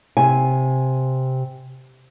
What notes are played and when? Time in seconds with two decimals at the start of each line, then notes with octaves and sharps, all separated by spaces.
0.17 C3 G#5